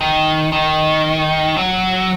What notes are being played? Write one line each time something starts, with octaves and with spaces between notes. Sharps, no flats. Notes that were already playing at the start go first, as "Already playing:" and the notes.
D#3
D#3
F#3